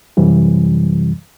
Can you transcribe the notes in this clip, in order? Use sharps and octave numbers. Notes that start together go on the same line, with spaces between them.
F#2 C3 E3 G3